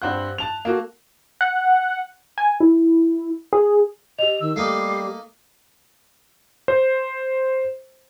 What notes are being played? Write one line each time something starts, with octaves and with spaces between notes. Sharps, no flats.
G2 C4 F#5 F#6
A5 F7
A#3 F#4 A4
F#5
G#5
E4
G#4
G4 D#5 F7
D#3 E6
G3 A3 A#3 D#4 C7
C5